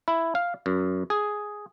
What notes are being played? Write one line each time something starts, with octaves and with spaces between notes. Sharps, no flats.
E4
F5
F#2
G#4